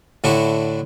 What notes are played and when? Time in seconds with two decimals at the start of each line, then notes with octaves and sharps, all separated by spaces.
0.24 A2 D3 D4 E4 F#4